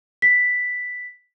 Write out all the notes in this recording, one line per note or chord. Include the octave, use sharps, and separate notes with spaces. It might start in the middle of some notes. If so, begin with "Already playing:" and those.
B6